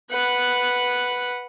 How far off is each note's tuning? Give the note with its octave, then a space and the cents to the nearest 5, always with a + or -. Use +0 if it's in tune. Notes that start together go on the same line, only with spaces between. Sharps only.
B4 +0 F#5 -5